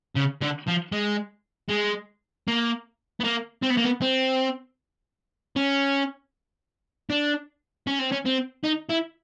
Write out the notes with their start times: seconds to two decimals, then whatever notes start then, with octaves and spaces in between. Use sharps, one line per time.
0.15 C#3
0.41 D3
0.68 F3
0.92 G#3
1.70 G#3
2.48 A#3
3.20 B3
3.24 A#3
3.62 C4
3.70 B3
3.77 A#3
3.84 B3
4.01 C4
5.56 C#4
7.10 D4
7.87 C#4
7.99 C4
8.12 C#4
8.25 C4
8.64 D#4
8.90 E4